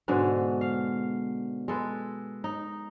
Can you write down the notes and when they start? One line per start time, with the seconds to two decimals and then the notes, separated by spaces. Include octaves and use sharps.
0.08 G#2 B2 D3 G#3
0.61 F5
1.68 G#3 A4 B4
2.44 D#4